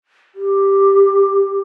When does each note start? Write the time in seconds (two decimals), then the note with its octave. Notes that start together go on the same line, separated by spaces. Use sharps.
0.35 G4